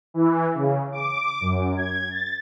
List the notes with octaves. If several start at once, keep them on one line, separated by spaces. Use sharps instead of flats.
E3
C#3
D6
F#2
G#6
A6